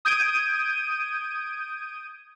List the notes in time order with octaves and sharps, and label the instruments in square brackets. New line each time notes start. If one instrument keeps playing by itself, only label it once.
[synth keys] D#6 G6 G#6 D7 D#7